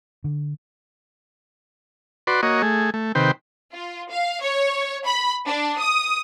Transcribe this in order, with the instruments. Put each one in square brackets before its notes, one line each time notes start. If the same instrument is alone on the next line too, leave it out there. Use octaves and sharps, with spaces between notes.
[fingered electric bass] D3
[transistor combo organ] F#4 B4 D5 C6
A#3 F#4 C#5 D#5
A3 G#4
A3
C3 D#3 B4 C5 G5
[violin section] F4
F5
C#5
B5
D4
D#6